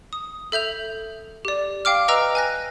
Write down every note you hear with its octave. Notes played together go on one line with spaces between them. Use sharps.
D#6
A4 E5 G6 F7
G4 D5
F5 G5 D6 F6
B4 D#5 G5 A#5 E6 F6
G#5 F#6 A#6